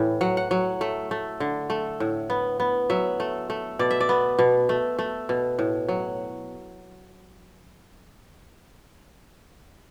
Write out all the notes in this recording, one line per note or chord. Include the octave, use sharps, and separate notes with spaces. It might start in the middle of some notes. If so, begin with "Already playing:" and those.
Already playing: A2 E3
F#3 F#5
F#5
F#3
A3
A3
D3
A3
A2
B3
B3
F#3 E5
A3
A3
B2 D5
E5
D5
B3
B2
A3
A3
B2
A2
F#3